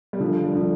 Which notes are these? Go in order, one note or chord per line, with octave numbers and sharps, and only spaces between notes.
G3
D3 F3
G3
D3 F3